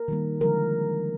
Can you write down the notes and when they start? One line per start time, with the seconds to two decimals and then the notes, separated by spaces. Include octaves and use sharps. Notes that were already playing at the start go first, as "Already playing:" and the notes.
Already playing: A#4
0.08 D#3 G3 A#3
0.41 D3 F3 G#3 A#4